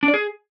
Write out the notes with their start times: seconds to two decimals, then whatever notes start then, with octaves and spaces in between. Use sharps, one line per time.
0.03 D4
0.08 D5
0.14 G#4